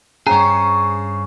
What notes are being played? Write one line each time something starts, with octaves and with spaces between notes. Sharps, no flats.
G2 C#3 C#4 G#4 C5 C#5 A#5